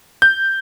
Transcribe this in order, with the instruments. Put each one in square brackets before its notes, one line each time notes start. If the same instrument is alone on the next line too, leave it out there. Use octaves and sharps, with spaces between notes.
[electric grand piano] G6